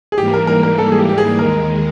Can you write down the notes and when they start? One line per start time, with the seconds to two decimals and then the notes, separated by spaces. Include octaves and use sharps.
0.12 G#4
0.18 G#2 E3 G3 A#3 G4
0.34 A#4
0.47 A#4
0.63 A#4
0.78 A4
0.92 G#4
0.98 G4
1.09 G4
1.18 G#4
1.38 D#2 D#3 G#3 A#4